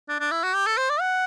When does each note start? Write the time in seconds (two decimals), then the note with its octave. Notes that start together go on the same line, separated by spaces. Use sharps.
0.09 D4
0.20 D4
0.31 E4
0.43 F#4
0.55 G4
0.66 A4
0.78 C5
0.90 D5
1.00 F#5